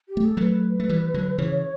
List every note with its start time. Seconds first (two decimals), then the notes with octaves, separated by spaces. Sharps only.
0.09 G4
0.17 A3
0.25 A4
0.37 F#3 A3 B4
0.80 A3
0.89 E3 G3
1.14 D3 F#3
1.38 C#3 E3 C#5